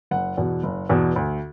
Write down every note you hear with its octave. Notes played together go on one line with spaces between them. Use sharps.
F#1 F#5
E2 B2
F#1
E2 B2
D2